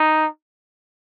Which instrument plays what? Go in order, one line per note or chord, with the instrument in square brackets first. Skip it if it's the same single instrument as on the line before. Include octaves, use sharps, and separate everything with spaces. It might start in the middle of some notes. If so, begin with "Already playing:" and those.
Already playing: [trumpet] D#4